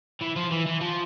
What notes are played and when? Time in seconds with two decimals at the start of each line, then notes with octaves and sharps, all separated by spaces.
0.21 E3
0.36 F3
0.51 E3
0.66 E3
0.81 F3